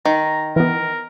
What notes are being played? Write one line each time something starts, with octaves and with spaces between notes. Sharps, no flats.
D#3 A#5
E3 B3 A#4